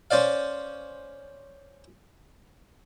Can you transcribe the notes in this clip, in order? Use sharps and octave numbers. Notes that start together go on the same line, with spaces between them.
C#4 C5 D5 F5